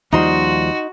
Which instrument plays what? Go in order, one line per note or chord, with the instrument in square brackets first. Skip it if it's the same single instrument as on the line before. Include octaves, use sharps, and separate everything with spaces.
[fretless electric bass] D#2 F3 G3 [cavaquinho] D#4 C6 [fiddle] F#4